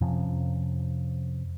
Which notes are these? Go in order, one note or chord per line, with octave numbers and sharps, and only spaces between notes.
F2 C3 F3 C#4